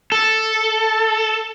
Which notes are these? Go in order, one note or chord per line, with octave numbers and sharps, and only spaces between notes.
A4